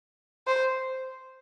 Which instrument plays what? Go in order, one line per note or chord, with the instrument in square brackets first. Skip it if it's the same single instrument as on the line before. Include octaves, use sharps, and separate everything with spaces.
[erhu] C5